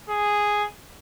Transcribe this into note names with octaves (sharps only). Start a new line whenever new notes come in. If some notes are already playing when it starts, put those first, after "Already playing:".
G#4